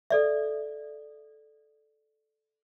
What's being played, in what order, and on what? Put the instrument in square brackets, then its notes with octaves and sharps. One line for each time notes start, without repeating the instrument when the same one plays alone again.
[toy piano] A4 D5 E5